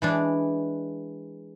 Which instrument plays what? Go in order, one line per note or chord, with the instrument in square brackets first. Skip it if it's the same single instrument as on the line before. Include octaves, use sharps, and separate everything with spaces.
[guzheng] E3 G#3 D4